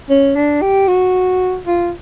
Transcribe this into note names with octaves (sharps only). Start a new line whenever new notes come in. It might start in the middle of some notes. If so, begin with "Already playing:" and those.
C#4
D4
G4
F#4
F4